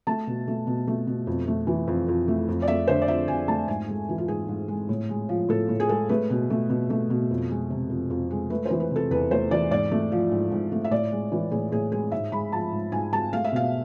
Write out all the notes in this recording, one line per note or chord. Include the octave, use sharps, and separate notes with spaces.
A3 A5
B2
A3
B2
A3
B2
F2
A3
E3
F2
F2
A3
F2
D5
A3 E5
D3 C5
D5
F2 E5
F2 G#5
A3 A5
G#2 G#5
G#3
E3
F4
G#2 G#4
G#2
G#3
A2
G#3
F3
A2 A4
A2
G#4
G#3 A4
A3 B4
B2
A3
B2
A3
B2
F2
G#3
C3
F2
F2
G#3
A3 B4
E3 C5
B4
C3
A4
E2 B4
A3 C5
E3 D5
G#2 D5
A3
F3
G#2
G#2
A3
E5
A2 D5
G#3
E3
A2 G#4
A2 G#4
G#3 G#4
G#2 E5
G#3 B5
F3 A5
G#2
G#2 G#5
G#3 A5
A3 F5
E5
B2 F5